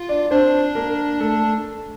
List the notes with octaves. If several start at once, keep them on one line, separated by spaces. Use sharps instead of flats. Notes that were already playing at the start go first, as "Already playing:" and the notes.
Already playing: F4
D4 D5
C4 D4 C5
A#3 A#4
A3 A4